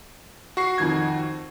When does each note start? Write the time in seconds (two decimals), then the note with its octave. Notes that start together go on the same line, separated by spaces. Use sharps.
0.57 F#4 C#6 C7
0.78 F2 D#3 G#6